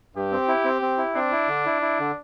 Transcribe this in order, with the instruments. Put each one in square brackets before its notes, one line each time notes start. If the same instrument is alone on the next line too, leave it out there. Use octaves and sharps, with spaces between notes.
[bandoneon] G2 [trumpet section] G4
[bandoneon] C4
E4
C4
C4
E4
[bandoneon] C4 [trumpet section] D4
[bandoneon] E4
D3
E4
E4
D3